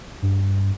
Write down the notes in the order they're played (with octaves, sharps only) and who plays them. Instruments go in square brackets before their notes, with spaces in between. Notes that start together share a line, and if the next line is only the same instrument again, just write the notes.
[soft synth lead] G2